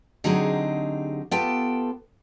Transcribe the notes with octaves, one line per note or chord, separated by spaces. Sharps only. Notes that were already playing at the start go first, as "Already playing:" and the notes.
D3 F#3 C4 D#4 G4 G#4
B3 F4 G4 A4 G5